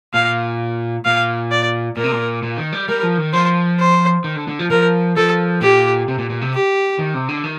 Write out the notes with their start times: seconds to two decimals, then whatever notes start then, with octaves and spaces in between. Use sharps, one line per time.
0.14 A#2 F5
1.05 A#2 F5
1.51 D5
1.97 A#2 A#4
2.04 C3
2.12 A#2
2.43 A#2
2.58 D#3
2.73 G3
2.88 G3 A#4
3.03 F3
3.18 D#3
3.33 F3 C5
3.79 C5
4.24 D#3
4.36 D3
4.48 D3
4.59 F3
4.70 F3 A#4
5.16 F3 A4
5.61 A#2 G4
6.08 C3
6.18 A#2
6.30 A#2
6.41 C3
6.54 G4
6.99 D#3
7.14 C3
7.29 D3
7.44 D#3